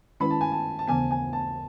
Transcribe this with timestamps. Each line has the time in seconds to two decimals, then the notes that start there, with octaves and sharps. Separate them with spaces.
0.20 D#3 G#3 C#4 E4 B4 B5
0.30 A5
0.41 G#5
0.52 A5
0.79 A5
0.88 D#2 C#3 E3 B3 G#5
1.11 G#5
1.33 A5